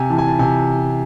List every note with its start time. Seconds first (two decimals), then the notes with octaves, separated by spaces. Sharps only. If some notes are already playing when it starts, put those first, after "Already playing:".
Already playing: C3 G#5
0.10 E3 A5
0.18 G#5
0.28 A5
0.39 C3 G#5